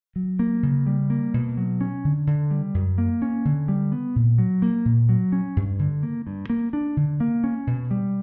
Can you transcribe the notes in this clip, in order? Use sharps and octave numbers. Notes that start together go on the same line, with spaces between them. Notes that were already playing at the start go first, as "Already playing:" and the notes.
F#3
A#3
C#3
G3
A#3
B2
F#3
C#4
D3
D3
G3
F#2
A#3
C#4
D3
G3
B3
A#2
F#3
A#3
A#2
F#3
C#4
G2
D3
A#3
G2
A#3
D4
D3
A#3
C#4
B2
G3